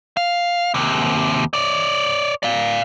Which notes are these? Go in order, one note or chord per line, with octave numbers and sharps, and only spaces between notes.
F5
D#2 C3
C#5 D5
D5 F5